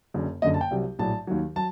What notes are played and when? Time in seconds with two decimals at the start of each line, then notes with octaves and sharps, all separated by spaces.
0.14 F#1 F#2 D3
0.42 F#1 F#2 D3 D#5
0.54 A5
0.61 G5
0.71 C2 C3 F#3
0.99 A#1 A2 F#3 A5
1.27 D#2 D#3 F#3
1.56 F#3 A5